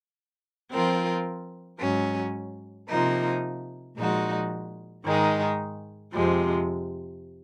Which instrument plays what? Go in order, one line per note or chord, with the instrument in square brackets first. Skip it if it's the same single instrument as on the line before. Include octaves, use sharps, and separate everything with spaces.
[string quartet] F3 C4 F4 A#4
G#2 F#3 C#4
C3 F3 A#3 D#4
A#2 F3 G#3 D#4 F#4
G#2 D#3 G#3 D#4
F2 C3 F3 G#3